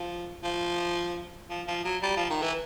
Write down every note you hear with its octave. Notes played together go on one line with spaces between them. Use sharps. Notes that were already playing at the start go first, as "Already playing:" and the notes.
Already playing: F3
F3
F3
F3
F#3
G3
F3
D#3
E3